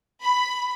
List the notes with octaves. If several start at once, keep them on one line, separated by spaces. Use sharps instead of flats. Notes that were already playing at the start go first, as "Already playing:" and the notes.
B5